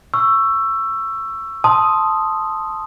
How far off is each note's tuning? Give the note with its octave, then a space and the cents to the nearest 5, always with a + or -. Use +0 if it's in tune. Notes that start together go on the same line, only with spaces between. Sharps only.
C#6 +0 E6 +15
A5 +0 C6 +0 D#6 +0